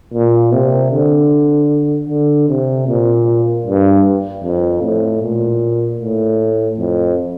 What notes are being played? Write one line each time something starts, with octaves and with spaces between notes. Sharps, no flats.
A#2
C3
D3
D3
C3
A#2
G2
F2
A2
A#2
A2
F2